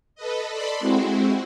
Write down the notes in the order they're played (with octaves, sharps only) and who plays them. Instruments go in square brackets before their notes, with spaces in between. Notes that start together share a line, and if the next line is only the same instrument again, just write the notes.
[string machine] A4 B4 D#5
A4 D5 B5 C6
G#3 C4 E4 F#4